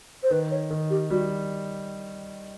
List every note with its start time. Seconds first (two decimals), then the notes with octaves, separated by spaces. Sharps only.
0.23 C5
0.30 D#3 B4
0.51 C#5
0.70 D#3
0.90 G4
1.10 G3 F#4